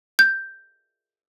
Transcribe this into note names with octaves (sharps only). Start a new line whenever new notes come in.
G6